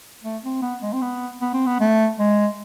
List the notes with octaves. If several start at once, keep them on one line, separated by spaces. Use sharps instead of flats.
A3
C4
B3
G#3
C4
B3
B3
C4
B3
A3
G#3